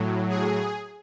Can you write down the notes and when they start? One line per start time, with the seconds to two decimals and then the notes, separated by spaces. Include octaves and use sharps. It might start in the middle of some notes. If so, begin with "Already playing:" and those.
Already playing: A2 F#3
0.29 G#4